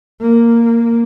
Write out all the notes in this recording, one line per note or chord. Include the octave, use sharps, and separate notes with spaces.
A#3